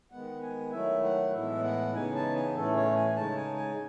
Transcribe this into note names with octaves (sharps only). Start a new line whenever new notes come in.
D#3 G#3 B3 F#5
G#5
D#3 F#3 A3 E4 E5
F#5
A2 E3 G#3 B3 E4 E5
F#5
C#3 E3 B3 D#4 G#5
A5
G#5
A2 E3 A3 C#4 A4
C#5
G#5
C#3 G#3 D#4 A5
G#5
G#5